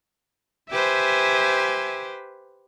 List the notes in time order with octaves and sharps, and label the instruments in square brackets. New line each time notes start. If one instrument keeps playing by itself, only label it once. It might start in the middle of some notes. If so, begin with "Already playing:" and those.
[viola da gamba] G4 B4 C5 [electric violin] E5 G#5